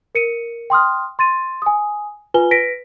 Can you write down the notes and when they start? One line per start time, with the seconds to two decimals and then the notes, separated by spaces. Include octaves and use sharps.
0.15 A#4 C#7 D#7
0.70 G5 C6 D#6 F6
1.19 C6 A6 D#7
1.62 G#5 D#6
2.34 F4 B4 G#5 G7
2.51 B4 A#6 B6 D7